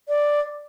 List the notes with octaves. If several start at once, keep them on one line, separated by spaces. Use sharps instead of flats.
D5